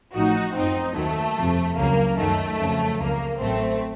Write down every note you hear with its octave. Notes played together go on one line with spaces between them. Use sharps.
A1 A2 F3 D#4 F#4
F#2 F3 C4 D#4
D#2 D#3 F#3 A3
F2 C3 F3
C#2 C#3 F#3 A#3
F#2 D#3 F#3 A3
F2 C#3 F#3
C#2 C#3 F3 A#3
A1 A2 F#3 A3 C4